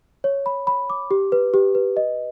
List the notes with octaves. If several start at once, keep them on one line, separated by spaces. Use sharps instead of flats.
C#5
B5
B5
D6
G4
B4
G4
B4
D#5